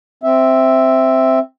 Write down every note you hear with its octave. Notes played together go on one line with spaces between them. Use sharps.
C4 E5